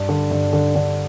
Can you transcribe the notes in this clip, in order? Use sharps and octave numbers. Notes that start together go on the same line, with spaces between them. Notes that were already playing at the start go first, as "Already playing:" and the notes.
Already playing: G2
D3
G2
D3
D3